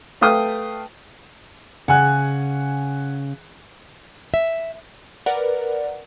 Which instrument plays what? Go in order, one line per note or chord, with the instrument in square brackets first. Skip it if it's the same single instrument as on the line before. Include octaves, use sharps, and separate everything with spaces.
[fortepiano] A3 B4 F5 G5 D#6
[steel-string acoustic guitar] C#3 [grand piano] F#5 G#5 F#6
[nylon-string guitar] E5
[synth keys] A#4 B4 D5 F#5